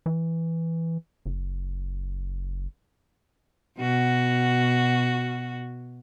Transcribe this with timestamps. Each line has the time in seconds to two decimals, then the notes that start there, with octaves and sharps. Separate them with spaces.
0.06 E3
1.26 F#1
3.79 B2 F#4